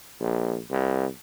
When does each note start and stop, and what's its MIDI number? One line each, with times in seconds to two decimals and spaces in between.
0.20 0.58 34
0.71 1.06 36